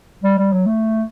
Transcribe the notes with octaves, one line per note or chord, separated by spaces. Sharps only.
G3
G3
F#3
A3